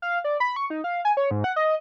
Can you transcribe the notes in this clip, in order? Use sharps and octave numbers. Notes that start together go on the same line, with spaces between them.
F5
D5
B5
C#6
D#4
F5
G#5
C#5
G#2
F#5
D#5